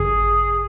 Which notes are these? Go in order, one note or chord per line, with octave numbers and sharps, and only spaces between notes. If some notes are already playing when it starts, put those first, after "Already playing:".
Already playing: G#1 F#2 C#3 G#4